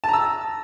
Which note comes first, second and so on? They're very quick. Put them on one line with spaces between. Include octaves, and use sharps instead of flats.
A5 A#5 E6